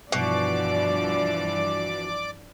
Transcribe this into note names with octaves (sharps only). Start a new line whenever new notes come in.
G2 B2 E3 F3 D4 D5 D6